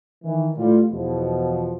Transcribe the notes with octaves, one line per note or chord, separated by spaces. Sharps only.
D#3 E3
A2 G3 F4
E2 B2 F3